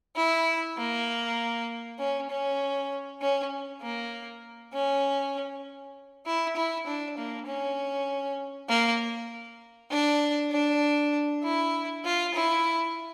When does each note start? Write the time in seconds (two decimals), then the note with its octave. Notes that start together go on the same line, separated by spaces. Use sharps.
0.16 E4
0.78 A#3
1.99 C#4
2.30 C#4
3.21 C#4
3.82 A#3
4.73 C#4
6.26 E4
6.56 E4
6.86 D4
7.17 A#3
7.47 C#4
8.69 A#3
9.91 D4
10.51 D4
11.43 E4
12.04 F4
12.34 E4